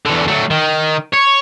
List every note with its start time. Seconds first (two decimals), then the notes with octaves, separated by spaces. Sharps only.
0.05 E2 D3
0.28 F#3 A3
0.50 D#3
1.13 C#5